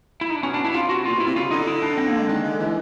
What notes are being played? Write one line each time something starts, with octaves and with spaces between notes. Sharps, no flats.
E4
D#4
D4
B2 C#4
D4
E4
C3 F4
F#4
A#2 F4
B2 E4
C3
C#3 F4
D3 D#4
E4
D4
C4
A#3
G#3
D#3
D3
E3